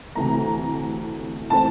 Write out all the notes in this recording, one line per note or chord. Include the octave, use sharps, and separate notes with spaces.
D2 C3 E3 A3 A#5
E3 A3 C4 A5